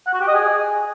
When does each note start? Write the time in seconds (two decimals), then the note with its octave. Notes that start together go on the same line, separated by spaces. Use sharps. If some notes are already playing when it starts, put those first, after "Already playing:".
0.07 F#5
0.14 F#4
0.21 G4
0.28 D#5
0.34 G#4